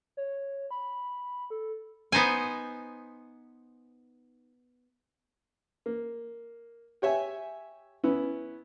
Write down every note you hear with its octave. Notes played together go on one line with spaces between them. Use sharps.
C#5
B5
A4
B3 D#4 C5 G#5
A#3
G4 C#5 E5 G#5
B3 C#4 E4